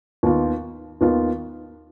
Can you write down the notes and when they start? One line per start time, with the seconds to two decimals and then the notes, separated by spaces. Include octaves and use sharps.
0.23 D#2 D#3 B3 F4
1.01 D#2 D#3 B3 F4